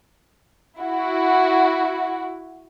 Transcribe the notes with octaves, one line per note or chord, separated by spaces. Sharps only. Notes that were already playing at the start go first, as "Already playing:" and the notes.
E4 F#4